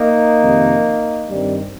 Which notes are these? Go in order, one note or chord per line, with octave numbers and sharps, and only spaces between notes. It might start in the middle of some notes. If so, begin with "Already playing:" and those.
Already playing: A#3 D#4
F2 C3 D#3
G2 D#3 G3 C4